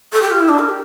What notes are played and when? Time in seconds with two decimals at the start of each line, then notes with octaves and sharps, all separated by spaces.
0.13 A4
0.22 G4
0.31 F4
0.40 E4
0.49 D4
0.59 A#4
0.69 G4